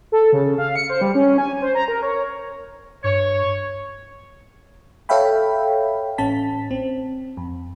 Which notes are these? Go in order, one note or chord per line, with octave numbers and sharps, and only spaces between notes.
A4
C#3
F5
C#7
C5
G3
C#4
G#5
C5
A#5
A#4
C#5
G2 C#5
A4 C#5 E5 F5 G5 B5
A1 C#4 A5 B6
C4
F2